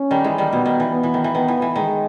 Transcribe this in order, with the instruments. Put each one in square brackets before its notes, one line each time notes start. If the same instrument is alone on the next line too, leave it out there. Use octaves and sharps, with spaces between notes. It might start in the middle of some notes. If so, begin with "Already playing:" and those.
Already playing: [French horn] C#4
[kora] D#3 G3
E3 G#3
D#3 G3
[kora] B2 [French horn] B3
[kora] D#3
E3
[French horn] B3
[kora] E3
D#3
E3
[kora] D#3 [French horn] B3
[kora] E3
E3
[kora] D#3 [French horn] G#3